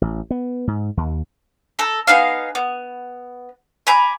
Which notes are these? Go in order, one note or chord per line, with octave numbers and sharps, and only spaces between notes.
A1
B3
G#2
D#2
A4 A#5
B3 D#4 G#4 F5
B3
G#5 A#5 B5 D6